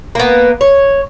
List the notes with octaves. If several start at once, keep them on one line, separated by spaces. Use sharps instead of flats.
A#3 B3
C#5